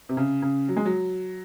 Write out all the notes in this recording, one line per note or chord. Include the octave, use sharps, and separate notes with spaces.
C3
C#3
C#3
F#3
G#3
F#3